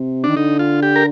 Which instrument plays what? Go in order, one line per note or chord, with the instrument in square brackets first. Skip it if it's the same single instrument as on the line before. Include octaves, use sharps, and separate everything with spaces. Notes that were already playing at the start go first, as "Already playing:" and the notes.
Already playing: [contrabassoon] C3
[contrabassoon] D#3 [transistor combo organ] D4
[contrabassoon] D3 [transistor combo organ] D#4
[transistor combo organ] F4
G4
A#4